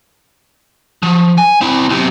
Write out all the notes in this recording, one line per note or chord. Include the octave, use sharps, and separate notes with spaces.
F3
G#5
C4 E4
B1 C3